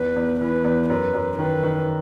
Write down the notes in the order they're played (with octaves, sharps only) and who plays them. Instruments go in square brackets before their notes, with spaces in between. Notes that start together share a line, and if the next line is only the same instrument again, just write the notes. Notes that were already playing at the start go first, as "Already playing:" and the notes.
Already playing: [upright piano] E2 [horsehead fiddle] B4
[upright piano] E2
[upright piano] E3 [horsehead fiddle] B4
[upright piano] E2
[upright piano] F#2 [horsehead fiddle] B4
[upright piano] F#2
[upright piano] D#3 [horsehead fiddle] B4
[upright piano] D#3